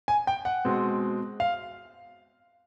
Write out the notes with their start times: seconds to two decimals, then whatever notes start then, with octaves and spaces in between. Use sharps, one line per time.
0.08 G#5
0.27 G5
0.45 F#5
0.65 B2 G#3 C4
1.40 F5